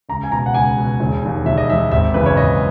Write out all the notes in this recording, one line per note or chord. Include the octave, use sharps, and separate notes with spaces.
C#2 A#5
G#5
B2 A#5
F#5
C#2 G#5
B2
E1
D#2 D#3
E1 E5
D#5
D#2 D#3 E5
G#1 E5
F#2 C#3 E3 B4
C#5
G#1 D#5